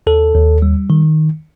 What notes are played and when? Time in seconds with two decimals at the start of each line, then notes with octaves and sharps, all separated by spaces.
0.07 D#2 A4
0.34 D#2
0.62 G3
0.90 D#3